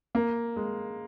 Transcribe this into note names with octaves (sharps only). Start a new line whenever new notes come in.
A#3
G#3